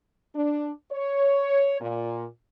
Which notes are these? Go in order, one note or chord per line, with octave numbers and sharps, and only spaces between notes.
D4
C#5
A#2